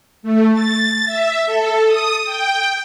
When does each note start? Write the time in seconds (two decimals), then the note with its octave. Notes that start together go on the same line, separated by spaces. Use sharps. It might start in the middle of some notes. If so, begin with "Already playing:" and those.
0.23 A3
0.53 A6
1.05 E5
1.46 A4
1.86 D#6
2.25 G5